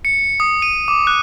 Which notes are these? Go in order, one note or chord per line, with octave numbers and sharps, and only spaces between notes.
C#7
D#6
D#7
D6
F#6